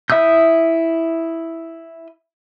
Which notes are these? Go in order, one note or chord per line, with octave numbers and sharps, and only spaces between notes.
E4 E5 D#6 E6 G6